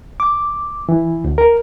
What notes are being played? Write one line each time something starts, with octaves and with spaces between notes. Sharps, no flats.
D6
E3
D2
A#4